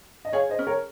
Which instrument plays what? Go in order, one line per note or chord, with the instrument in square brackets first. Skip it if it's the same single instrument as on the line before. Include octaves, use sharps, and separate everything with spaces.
[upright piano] D#5
[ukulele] G#4 [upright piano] C#5 F5
[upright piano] C5 D#5
[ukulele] C#4
[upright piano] A#4 C#5